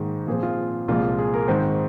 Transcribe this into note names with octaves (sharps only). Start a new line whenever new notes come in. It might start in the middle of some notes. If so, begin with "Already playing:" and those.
Already playing: G#2 D#3 A#3 G#4
A#2 F3 C4 G#4
F4
C2 A#2 F3 G#3 F4
G#4
A#4
G#2 D#3 C4 C5